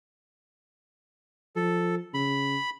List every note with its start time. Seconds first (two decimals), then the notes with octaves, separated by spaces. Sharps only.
1.56 F3 A4
2.14 C#3 B5